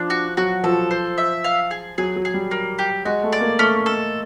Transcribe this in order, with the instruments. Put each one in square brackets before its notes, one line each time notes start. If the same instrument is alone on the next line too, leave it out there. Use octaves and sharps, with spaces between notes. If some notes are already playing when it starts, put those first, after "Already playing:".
Already playing: [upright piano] F3 [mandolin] D4
[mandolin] F#4
[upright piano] F#3 [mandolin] F#4
[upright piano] F3 [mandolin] A4
[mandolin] C5
E5
F5
G#4
[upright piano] F#3 [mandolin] G#4
[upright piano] F#3
[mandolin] G#4
[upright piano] G3
[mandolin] A#3
G4
[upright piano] G#3 [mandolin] F#4
[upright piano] A3
[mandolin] D5
[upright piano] A#3
[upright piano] A3 [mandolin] C#4
[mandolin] A4